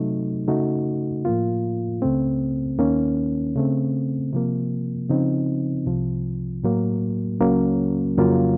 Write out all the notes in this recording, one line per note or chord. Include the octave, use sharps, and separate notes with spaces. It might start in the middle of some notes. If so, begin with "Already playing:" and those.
Already playing: C3 F#3 A3 D#4
C#3 A3 D#4 F#4
A2 F3 A#3 F4
C#2 C#3 A3 C4
D#2 D#3 A#3 C#4
C#3 A3 C4
C3 F3 A#3
C#3 F3 C4 D#4
C2 C3 F3
A2 F#3 A#3
C#2 C#3 F#3 A#3 C#4
F2 C#3 F#3 A#3 F4